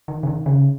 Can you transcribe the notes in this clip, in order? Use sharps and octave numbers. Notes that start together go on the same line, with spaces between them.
D#3
C#3
D#3
C#3